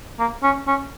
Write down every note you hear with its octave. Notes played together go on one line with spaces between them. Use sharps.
A#3
C#4
C#4